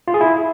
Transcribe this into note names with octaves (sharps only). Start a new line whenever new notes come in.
F4
G#4
E4